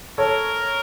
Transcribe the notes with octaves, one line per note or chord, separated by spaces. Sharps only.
A4 A#4 C#5